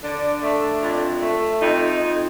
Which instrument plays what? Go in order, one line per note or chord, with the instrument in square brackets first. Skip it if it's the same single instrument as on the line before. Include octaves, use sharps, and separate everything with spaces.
[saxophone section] D3 D4
A3
F2
A3
F2 D#4
F2